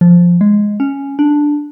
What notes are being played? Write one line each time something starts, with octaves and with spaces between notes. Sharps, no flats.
F3
G#3
C#4
D4